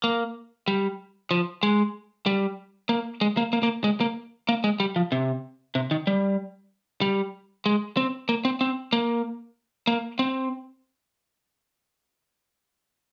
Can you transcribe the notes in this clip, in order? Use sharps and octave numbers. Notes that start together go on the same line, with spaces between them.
A#3
G3
F3
G#3
G3
A#3
G#3
A#3
A#3
A#3
G#3
A#3
A#3
G#3
G3
F3
C3
C3
D#3
G3
G3
G#3
C4
A#3
C4
C4
A#3
A#3
C4